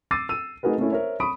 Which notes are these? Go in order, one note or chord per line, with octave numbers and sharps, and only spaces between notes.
D6 E6 A6 C7 D#7
E6 D#7
A3 D#4 F#4 G#4 A#4 B4
A3 A#3 C#4 E4
A#4 C5 C#5 E5
B5 C#6 D#6 D7